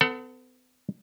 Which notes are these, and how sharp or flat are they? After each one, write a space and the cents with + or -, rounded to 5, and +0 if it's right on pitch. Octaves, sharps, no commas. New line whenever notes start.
B3 +45 A4 +25 F#5 +0